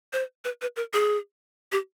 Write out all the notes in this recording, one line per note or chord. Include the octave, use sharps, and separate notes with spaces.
C5
B4
B4
A#4
G#4
G4